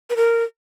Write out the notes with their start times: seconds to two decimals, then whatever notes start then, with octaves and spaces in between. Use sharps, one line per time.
0.10 B4
0.16 A#4